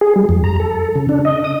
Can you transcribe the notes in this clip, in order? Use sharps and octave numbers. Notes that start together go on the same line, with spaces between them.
G#4
G3
F2
A#5
A4
C#3
D4
D#5
D#6